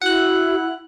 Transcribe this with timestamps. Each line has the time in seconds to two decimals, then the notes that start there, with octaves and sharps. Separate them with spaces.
0.02 E4 F#4 F#5 F#6